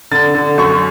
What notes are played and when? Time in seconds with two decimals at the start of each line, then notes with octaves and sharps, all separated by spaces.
0.11 D3 A6
0.34 D3
0.58 F#2 C#6